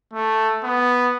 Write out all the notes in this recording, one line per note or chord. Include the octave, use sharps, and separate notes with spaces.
A3
B3